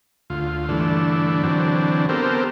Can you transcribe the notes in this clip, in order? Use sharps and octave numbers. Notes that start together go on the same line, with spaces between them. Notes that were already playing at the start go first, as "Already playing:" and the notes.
D2 F4
G2 D3 E3 A3 D4
D3 E3 F#3 C4 D4
B3 C4 G4 A4 A#4 C5